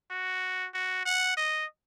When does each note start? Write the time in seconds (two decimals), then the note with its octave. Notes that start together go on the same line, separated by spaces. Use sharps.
0.11 F#4
0.74 F#4
1.06 F#5
1.37 D#5